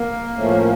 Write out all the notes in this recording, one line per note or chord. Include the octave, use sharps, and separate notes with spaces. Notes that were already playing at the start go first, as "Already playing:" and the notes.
Already playing: A#3
A2 F3 A3 C#4